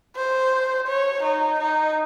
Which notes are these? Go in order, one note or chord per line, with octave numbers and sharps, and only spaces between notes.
C5
C#5
D#4
D#4